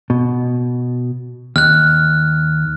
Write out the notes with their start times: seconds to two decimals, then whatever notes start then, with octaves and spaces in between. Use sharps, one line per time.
0.10 B2
1.56 D#2 F6 F#6